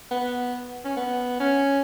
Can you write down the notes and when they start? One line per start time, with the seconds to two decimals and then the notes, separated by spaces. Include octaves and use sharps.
0.11 B3
0.85 C#4
0.97 B3
1.40 C#4